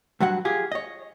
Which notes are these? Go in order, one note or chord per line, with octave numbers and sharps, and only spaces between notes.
G2 F#3 F#4 F#5
F4 G4 G#4
C#5 D#5